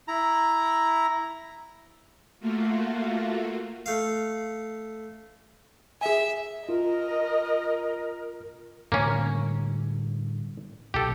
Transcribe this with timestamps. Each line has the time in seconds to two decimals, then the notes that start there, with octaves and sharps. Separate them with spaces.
0.08 E4 A#5
2.40 A3 A#3 F4 F#4
3.86 A3 F5
6.01 G#4 E5 G#5
6.69 F4 A#4 D#5
8.92 A2 D3 G3 A#3 C#4
10.94 B1 G4 A4